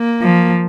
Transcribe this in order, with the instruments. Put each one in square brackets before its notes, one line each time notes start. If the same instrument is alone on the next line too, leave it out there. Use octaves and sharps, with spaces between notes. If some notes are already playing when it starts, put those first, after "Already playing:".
Already playing: [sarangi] A#3
[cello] F3